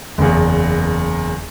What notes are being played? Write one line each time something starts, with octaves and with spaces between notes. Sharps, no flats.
F#1 E2